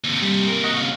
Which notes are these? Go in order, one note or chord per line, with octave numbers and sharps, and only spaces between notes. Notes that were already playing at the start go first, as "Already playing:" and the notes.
D#2 C3
G3
A#4
F#4 D#5
C#3 F#4 F5